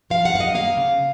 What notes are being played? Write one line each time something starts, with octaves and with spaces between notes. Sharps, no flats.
F3 F5
F#5
F#2 F5
D#5
A#3 F5
C#3